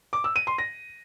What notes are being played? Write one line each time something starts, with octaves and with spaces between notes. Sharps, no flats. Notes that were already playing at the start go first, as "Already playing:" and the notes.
D6
E6
D#7
C6
A#6